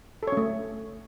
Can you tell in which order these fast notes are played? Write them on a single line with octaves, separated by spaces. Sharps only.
A4 C#5 C#4 A3